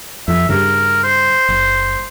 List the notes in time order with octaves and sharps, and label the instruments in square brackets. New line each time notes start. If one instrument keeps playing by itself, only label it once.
[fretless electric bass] F2 [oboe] E5
[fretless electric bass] G2 C#3 [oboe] A#4
[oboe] C5
[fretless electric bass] F#1